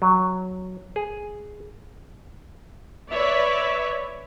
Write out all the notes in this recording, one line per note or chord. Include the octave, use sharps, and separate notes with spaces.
F#3
G#4
B4 C#5 D5 E5